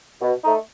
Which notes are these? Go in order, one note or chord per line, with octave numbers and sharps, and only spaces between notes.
B2
A3 D#4